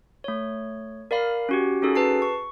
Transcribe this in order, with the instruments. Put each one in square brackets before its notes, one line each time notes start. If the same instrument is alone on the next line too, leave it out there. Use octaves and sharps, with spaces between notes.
[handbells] A3 C#5
A#4 D5 F5 B5
C#4 F#4 G4
C#4 D#4 F#4 G#4 A4
B4 A5 C7
C#6